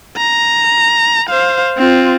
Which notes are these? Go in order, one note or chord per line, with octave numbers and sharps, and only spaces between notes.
A#5
C5 F5
C4 F4